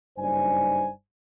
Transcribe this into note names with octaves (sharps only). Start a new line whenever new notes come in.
F#1 G2 D#4 C5 D5 G#5